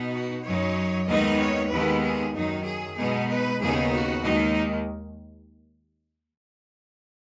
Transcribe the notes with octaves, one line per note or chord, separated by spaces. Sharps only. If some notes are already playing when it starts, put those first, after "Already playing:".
Already playing: B2 B3 D#4
F#4
F#2 F#3 D#4 C#5
D#2 D#3 G#3 B3 D#4 D#5
C#5
D#2 D#3 G#3 B3 B4
G#4
F#2 D#3 F#3 D#4
G#4
B2 G#3 B3 D#4 G#4
B4
D#2 C#3 B3 D#4 G#4
F#4
D#2 D#3 G#3 D#4